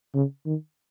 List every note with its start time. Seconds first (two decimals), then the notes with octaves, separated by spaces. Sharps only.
0.15 C#3
0.46 D#3